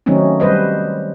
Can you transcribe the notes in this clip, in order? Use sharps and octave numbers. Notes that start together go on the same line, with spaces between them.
D#3 F#3 A3 C4 C#4 D#4
G3 C4 B4 C5 D#5